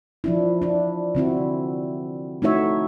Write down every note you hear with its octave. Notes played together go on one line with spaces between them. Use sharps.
F3 D4 E4
D4 E4
D3 C4 E4 F#4
A3 D#4 E4 F#4 C#5 E5